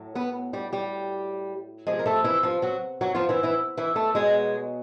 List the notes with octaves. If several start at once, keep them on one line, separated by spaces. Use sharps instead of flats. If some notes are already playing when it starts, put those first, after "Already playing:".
Already playing: A2 F#3
B3 B4
G3 G4
G3 G4
C3 F3 G#3 G#4
A#4
A3 A4
E3 E4
F3 F4
F#3 F#4
F#3 F#4
F3 F4
E3 E4
E3 E4
E3 E4
A3 A4
B2 F#3 G#3 G#4